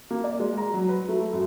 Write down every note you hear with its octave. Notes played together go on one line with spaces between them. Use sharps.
A#3
D5
G#3
A#5
F#3
B4
A3
F#2